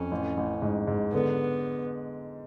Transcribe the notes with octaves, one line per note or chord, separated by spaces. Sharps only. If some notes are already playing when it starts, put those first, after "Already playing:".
Already playing: F2 C#4
A1
A1
G#2
G#2
D3 B3